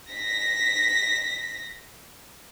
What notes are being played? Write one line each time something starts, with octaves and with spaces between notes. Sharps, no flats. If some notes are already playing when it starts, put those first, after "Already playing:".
A#6 B6